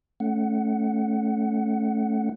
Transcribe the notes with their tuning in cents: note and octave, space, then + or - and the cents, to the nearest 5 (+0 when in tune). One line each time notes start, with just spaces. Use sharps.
A3 -10 C#4 +0 F#5 +10